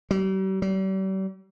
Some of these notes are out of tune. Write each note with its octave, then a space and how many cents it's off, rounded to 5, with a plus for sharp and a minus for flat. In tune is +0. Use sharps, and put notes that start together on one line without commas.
G3 -45
G3 -40